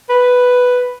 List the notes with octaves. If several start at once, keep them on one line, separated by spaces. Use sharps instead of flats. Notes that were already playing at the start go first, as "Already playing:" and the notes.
B4